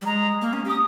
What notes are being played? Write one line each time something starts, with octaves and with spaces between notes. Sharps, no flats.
G3
G#3 A#5
A#3
C#4
G4
D#6